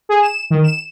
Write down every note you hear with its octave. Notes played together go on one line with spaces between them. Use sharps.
G#4
E7
D#3
E7